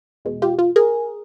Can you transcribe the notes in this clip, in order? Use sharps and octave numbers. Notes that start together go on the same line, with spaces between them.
E2 B2 G#3
F4 G4
F4
G#4 A#4